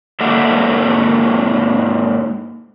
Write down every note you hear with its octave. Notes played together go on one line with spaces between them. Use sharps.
G#2 A#3 D4 A4 E5 F#5